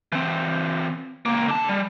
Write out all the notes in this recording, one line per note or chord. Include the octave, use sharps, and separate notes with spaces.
E3 C4
C#2 A#3
D3 A5
G3